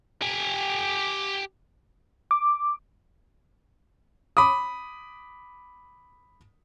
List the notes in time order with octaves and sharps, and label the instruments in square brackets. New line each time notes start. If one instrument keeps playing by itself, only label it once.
[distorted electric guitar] G4 G#5
[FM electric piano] D6
[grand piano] B5 D6 D#6